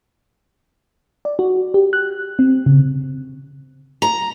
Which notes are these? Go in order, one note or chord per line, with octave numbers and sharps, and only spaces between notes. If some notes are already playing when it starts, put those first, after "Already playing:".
D5
F#4
G4
F#6
C4
C#3
A#5